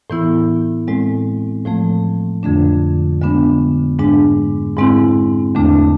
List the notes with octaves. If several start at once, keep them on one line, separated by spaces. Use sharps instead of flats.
A2 E3 B3 E4
A2 G#3 C4
A2 F3 A3
F2 D3 A3 D4
D3 G#3 B3 D4
G#2 G#3 D4
G#2 G#3 C4 E4
E2 D3 A3 D4